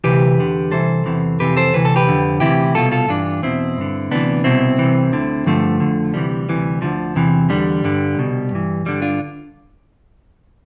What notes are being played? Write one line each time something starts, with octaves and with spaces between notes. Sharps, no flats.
D2 C3 E3 G4 B4
E2 D3
C2 C3 E3 A4 C5
E2 C3 E3
F2 C3 E3 G4 B4
A4 C5
D2 C3 E3 B4
A4
G4 B4
F2 D3
D2 C3 E3 E4 G4
C2 B2 F4 A4
F4 A4
G2 E3 D4 F4
E2 B2 C4 E4
G2 D3
D2 C3 E3 B3 D4
C2 B2 C4 E4
C2 C3 E3
D2 D3
G2 D3 F3 A3
F2 D3
D2 C3 E3 G3
D2 C3 E3
D2 D3 F3
E2 C3 E3
E2 D3 G3
G2 D3
C2 B2
G2 E3
G2 D3 G3
D4 F4